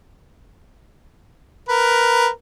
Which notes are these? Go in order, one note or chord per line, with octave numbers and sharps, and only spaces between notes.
A#4 B4